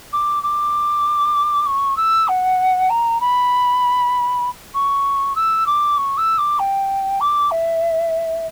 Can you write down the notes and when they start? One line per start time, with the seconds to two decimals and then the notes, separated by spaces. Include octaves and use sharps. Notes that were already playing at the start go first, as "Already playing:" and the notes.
0.13 D6
0.43 D6
1.66 C#6
1.97 E6
2.28 F#5
2.90 A#5
3.20 B5
4.74 C#6
5.36 E6
5.66 D6
5.97 C#6
6.17 E6
6.38 D6
6.59 G5
7.20 D6
7.51 E5